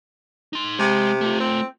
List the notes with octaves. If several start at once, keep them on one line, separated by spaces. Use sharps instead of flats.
D#4 C6
C3 G#3
A3 F4
C4